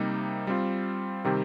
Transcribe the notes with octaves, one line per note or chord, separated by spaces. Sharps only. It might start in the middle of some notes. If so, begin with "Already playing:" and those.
Already playing: C3 G3 A#3 D#4
G3 C4 F4
C3 D#3 G3 C4 G4